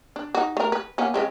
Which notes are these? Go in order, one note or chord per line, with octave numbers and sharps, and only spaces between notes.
D4
D#4 F#4
A3 A#4
B4
A#3 B3 C#4
C#3 G#3 C4